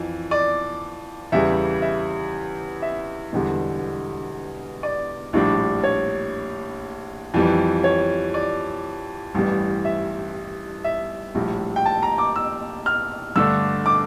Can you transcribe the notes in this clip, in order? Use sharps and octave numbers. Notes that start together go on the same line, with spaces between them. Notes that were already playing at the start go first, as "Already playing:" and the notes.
Already playing: F2 E3
D5
E2 C#3 E3 G3 E5
E5
E5
E1 E2 D3 G3
D5
A#1 A2 G3 D4
C#5
F2 E3 G3
C#5
D5
A1 G2 E3 G3
E5
E5
A#1 A2 G3
G5
A5
A#5
D6
E6
F6
G2 D3 A3 D4 E6
D6